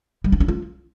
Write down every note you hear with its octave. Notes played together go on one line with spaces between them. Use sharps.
G3
D4
C#4
F4